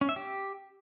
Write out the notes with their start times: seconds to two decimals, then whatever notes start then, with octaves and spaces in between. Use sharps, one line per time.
0.01 C#4
0.09 E5
0.16 G4